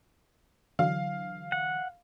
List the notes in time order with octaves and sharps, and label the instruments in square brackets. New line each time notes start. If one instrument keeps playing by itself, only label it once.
[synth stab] D3 E3 F#3 [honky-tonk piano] F5
[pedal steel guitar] F#5